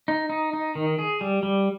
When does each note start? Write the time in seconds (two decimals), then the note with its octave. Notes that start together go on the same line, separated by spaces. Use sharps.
0.08 D#4
0.30 D#4
0.53 D#4
0.75 D#3
0.99 G#4
1.21 G3
1.43 G3